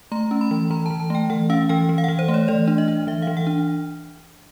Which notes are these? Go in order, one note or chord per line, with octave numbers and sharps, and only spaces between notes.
A3 A#5
C#4
B5
E3
E3 A#5
A5
E3
A5
A3 G5
E3 F#5
C#4 F5
E3 G5
E3
F5
F#5
E3
C5
A3
C#5
E3 D5
D4
D#5
D4
E3 E5
F5
E3
F#5
D4